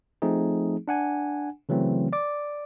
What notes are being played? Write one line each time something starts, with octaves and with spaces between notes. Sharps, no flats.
F3 A3 C4 D#4 G#4
D4 F#5 G#5
C#3 E3 F#3 A3 C4
D5 D6